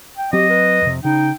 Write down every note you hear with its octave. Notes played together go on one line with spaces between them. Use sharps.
G5
F#3 C4 G4 D#5
B4
F2 C3
C#3 D#4 G5